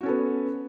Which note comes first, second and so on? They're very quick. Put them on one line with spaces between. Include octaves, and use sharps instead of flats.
F#4 C#4 A4 B3